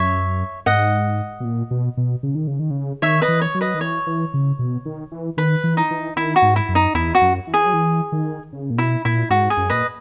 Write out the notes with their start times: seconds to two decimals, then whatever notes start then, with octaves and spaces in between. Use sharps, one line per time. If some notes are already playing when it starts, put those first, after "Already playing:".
Already playing: F#2 C#5 E5
0.66 G#2 D#5 F#5
1.40 B2
1.45 A#2
1.71 B2
1.97 B2
2.23 C#3
2.35 D#3
2.47 C#3
2.59 D#3
2.71 C#3
3.02 D#3 C#5 E5
3.22 B4 D#5
3.28 E3
3.41 C#5
3.54 F#3
3.61 B4 D#5
3.74 D#3
3.81 E3 C#5
4.07 E3
4.34 C#3
4.59 B2
4.86 D#3
5.12 E3
5.37 D#3 B4
5.64 E3
5.77 D#4
5.91 E3
6.16 D#3 E4
6.36 F#4
6.42 G#2
6.56 E4
6.69 F#2
6.75 D#4
6.95 E2 E4
7.15 F#4
7.22 F#2
7.47 E3
7.54 G#4
7.66 F#3
7.74 E3
8.12 D#3
8.53 C#3
8.70 A#2
8.78 B2 E4
9.05 A#2 E4
9.30 G#2 F#4
9.50 G#4
9.57 F#2
9.70 A#2 B4 D#5